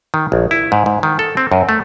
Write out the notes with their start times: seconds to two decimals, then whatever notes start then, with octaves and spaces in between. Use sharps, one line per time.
0.14 D#3
0.32 A#1
0.51 E4
0.72 G#2
0.86 G#2
1.03 D#3
1.19 A4
1.37 C4
1.52 F#2
1.69 A3